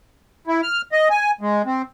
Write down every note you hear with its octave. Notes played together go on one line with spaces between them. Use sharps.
E4
F6
D#5
G#5
G#3
C4